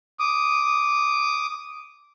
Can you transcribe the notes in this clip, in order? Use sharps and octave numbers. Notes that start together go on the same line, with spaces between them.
D6 D#6